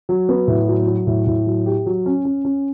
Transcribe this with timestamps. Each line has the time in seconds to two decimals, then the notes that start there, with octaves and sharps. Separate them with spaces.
0.09 F#3
0.29 B3
0.48 A2
0.68 F#3
0.87 F#3
1.07 A2
1.27 A2
1.46 F#3
1.66 G4
1.86 F#3
2.06 C#4
2.25 C#4
2.45 C#4